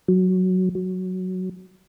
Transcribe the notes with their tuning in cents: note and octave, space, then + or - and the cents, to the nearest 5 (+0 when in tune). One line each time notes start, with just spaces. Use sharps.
F#3 +0
F#3 +0